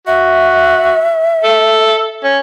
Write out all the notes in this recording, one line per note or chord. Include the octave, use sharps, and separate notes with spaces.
F#4 E5
A4
C#4